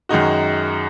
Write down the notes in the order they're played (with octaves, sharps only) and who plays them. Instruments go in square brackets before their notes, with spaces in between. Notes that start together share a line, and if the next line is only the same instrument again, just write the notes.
[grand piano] F#2 D#3 G#3 D#4 F#4